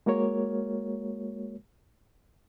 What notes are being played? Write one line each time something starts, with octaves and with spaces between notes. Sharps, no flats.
G#3 A#3 F#4 A#4 C#5